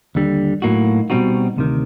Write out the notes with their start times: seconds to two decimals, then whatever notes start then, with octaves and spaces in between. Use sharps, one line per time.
0.15 D#2 D3 G3
0.62 A2 F#3 A#3 D#4 F#4
1.10 B2 G3 C4 D#4 F#4
1.56 D2 C3 D#3